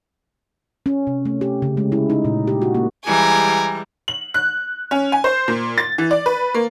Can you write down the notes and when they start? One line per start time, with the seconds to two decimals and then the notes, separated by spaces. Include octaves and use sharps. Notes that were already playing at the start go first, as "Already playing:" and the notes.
0.86 C#4
1.07 C3
1.25 A3
1.41 G4
1.62 C#3
1.77 G#3
1.92 E4
2.10 D#4
2.25 A#2
2.47 G4
2.62 F#4
2.75 A#3
3.06 E3 G3 G#3 G#5 A#5
4.08 F#7
4.34 F#6
4.91 C#4
5.12 G#5
5.24 C5
5.48 A#2
5.78 A6
5.98 E3
6.11 D5
6.26 B4
6.54 A#3